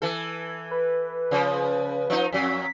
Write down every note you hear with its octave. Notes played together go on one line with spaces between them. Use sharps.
E3 A4
B4
C#3 F3
F3 D#4
F2 F#3 B6